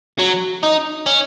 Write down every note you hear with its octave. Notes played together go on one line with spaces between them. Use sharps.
F#3
D#4
C#4